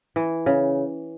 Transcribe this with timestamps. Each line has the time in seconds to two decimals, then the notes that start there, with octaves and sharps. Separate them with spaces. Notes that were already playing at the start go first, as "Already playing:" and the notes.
0.16 E3
0.46 C#3